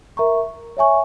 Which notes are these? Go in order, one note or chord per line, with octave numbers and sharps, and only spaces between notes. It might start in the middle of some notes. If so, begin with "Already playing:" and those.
A#4 E5 A#5 C#6
C#5 E5 G#5 C#6